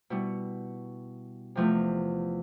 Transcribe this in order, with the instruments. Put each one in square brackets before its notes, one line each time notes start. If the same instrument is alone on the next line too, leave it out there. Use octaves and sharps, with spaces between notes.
[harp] B2 G3 B3 E4
E2 C3 F3 A3